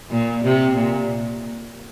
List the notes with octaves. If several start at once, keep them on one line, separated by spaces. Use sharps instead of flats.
A#2
C3
A#2